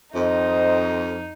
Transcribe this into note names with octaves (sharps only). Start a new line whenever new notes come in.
F2 D#3 D#4 C5 D#5